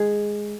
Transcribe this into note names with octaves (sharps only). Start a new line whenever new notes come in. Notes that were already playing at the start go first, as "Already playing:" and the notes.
Already playing: G#3 G#4